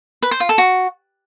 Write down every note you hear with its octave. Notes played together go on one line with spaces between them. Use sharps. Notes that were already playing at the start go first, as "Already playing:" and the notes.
B4
C5
F4
A4
F#4